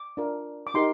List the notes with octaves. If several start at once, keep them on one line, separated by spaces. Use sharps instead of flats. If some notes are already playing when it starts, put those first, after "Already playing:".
Already playing: D6
D4 F4 A#4
D6
D#4 G4 A#4 C6